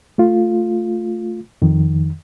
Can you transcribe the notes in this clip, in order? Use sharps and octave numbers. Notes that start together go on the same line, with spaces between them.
A3 F4
F2 D#3